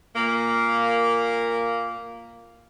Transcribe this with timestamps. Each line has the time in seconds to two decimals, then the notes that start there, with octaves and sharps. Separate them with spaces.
0.15 A#2 A#3